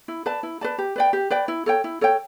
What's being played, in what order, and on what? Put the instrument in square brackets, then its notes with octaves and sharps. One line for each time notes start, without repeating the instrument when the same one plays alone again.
[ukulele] E4
B4 D5 A5
E4
B4 D5 A5
G4
B4 D5 G5
G4
B4 D5 G5
E4
A4 C#5 G5
E4
A4 C#5 G5